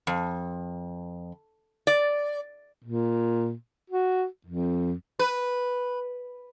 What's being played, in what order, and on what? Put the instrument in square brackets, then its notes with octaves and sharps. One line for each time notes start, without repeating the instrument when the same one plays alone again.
[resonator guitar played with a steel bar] F2
D5
[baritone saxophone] A#2
F#4
F2
[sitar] B4